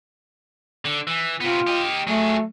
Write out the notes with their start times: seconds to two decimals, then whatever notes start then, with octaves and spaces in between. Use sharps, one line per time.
0.85 D3
1.07 E3
1.41 C3 B3 F4
1.67 G4 D#5
2.07 F#3 A3 G#4